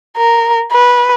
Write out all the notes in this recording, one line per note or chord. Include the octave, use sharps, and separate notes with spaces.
A#4
B4